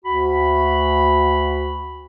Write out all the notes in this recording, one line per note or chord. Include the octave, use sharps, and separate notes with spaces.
D2 F#4 B5